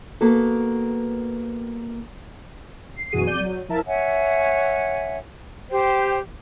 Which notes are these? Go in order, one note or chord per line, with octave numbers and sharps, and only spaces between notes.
A#3 B3 F#4 A4
C7
F#2 B2 E3 F#4 G#4 D#7
F2 D5 G6 D#7
F#3
F3 E4 A#4 E5 A5
C#5 E5 F#5 G#5
G4 C5 G5